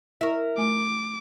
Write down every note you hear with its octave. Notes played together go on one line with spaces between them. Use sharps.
E4 A#4 E5 C#6
A3 G#5 D6